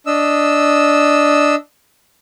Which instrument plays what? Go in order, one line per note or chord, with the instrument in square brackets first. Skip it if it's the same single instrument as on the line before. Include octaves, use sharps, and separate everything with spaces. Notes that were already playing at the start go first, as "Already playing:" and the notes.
[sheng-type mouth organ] D4 D#5 E6